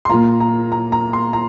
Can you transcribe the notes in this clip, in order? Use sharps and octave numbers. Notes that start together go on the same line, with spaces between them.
C6
A#2 A#3 F4 A#5
A#5
A#5
A#5
C6
A#5